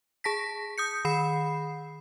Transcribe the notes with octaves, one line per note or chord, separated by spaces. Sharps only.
G#4 A5 A#6 B6
D#6 G6 C#7
D#3 B5 C7